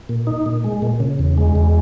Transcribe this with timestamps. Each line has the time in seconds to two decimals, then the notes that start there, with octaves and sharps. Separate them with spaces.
0.09 A#2
0.27 D#4
0.46 A#2
0.64 G#3
0.82 A#2
1.00 C#3
1.19 E2
1.38 G#3
1.56 E2